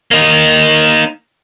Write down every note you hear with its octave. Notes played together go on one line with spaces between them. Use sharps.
A#3 D#4